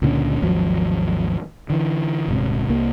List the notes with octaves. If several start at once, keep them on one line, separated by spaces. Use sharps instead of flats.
C#2 A#2 D3 C#4
G#1 D#2 F3 F#3
D3 E3
D#1 G#2 C3
C2 A#3